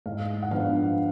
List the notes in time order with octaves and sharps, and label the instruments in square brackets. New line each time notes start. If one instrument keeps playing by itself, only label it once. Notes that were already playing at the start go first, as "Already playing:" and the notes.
[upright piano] G#2 F5
F#5
F3 B3 D4 F5